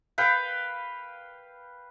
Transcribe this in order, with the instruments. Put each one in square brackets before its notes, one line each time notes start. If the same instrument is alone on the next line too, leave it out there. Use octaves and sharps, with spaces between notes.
[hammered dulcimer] B4 F5 G5